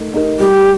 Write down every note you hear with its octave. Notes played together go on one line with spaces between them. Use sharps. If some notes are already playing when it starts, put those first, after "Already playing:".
Already playing: A3 D#4 A#4
D#4 G4 A#4
G3 G4